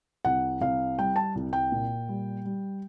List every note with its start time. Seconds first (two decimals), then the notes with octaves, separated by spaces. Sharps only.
0.25 C2 F#5
0.61 C2 F5
0.99 G3 G5
1.16 A5
1.35 C2
1.53 G5
1.72 A#2
2.09 G3
2.45 G3